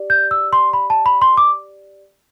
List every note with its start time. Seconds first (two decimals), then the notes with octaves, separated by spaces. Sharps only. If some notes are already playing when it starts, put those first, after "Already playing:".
Already playing: G4 D5
0.10 G6
0.31 E6
0.53 C6
0.73 B5
0.90 A5
1.06 B5
1.22 C6
1.37 D6